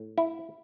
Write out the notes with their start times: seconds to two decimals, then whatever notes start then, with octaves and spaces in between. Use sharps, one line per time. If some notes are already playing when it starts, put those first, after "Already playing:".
Already playing: A2
0.18 E4